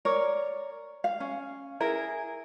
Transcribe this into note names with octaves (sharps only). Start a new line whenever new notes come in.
A#4 C#5 D5
F5
C#4
E4 G#4 A#4